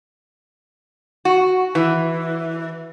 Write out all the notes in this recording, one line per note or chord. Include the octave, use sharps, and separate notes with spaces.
F#4
E3